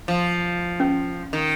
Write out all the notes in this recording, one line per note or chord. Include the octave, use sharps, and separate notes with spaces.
F3
C#4
D#3